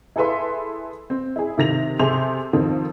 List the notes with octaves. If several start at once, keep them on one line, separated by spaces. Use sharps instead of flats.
E4 G#4 A4 B4 E5 C6
C4
E4 G#4
C3 D#3 A#6 F7
C3 G#4 A4 C6 G6 F7
F2 D#3 C4